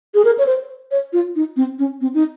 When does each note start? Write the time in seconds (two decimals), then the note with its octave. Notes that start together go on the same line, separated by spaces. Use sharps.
0.14 G#4
0.25 A#4
0.38 C#5
0.46 C5
0.91 C#5
1.13 F4
1.36 D#4
1.56 C4
1.79 C#4
2.01 C4
2.14 D#4